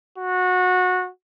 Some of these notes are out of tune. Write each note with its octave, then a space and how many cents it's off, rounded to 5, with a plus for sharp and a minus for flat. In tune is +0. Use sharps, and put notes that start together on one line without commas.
F#4 -20